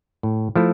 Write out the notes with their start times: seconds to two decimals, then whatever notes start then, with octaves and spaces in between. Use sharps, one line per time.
0.23 A2
0.55 F3 A3 E4